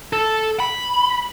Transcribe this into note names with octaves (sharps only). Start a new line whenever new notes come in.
A4
B5